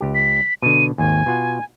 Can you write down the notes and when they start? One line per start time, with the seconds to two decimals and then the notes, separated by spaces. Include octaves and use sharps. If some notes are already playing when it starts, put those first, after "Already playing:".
0.01 C#2 G4
0.15 B6
0.62 B2 D3 D#7
0.98 G#1 D#2 G#5
1.26 B2 F4 F#5